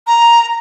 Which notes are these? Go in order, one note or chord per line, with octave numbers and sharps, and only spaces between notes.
A#5